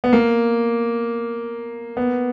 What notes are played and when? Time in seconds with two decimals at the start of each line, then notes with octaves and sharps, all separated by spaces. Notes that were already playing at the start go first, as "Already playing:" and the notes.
0.04 B3
0.13 A#3
1.97 B3